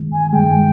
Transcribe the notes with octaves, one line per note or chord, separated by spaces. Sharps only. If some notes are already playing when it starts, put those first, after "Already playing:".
Already playing: G2 D#3 G#3
G#5
G2 D#3 G#3 G5